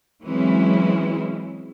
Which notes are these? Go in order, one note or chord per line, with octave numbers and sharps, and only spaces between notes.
E3 F#3 G#3 C4 C#4 E4